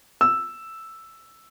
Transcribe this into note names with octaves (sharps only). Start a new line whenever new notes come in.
E6